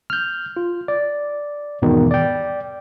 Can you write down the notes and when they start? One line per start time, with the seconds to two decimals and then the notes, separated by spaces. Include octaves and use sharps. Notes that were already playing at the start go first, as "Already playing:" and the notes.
0.10 F6 G6
0.57 F4
0.88 D5
1.82 E2 G#2 B2 D#3
2.11 D5 G5